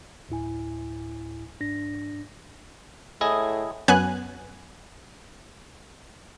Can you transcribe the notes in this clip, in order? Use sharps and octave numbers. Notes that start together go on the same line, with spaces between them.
D2 A2 E4 G#5
G#2 D4 A#6
A2 E4 G#4 D#5
F#2 F#3 B3 G#5 F#6